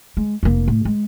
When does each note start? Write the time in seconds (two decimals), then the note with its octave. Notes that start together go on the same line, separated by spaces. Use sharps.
0.17 G#3
0.43 F1 A#3
0.68 A2
0.85 G#3